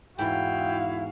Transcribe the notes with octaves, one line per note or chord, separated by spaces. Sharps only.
E2 G#2 E4 F#4 F5 G5